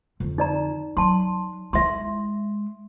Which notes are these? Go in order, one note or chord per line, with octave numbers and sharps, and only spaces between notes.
F2 D3
D#4 D5 A#5
F#3 A5 C6
G#3 E4 E5 C6